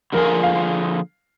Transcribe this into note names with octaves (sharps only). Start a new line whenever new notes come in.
D3 F3 A#3 F4 G#4 A#4
F5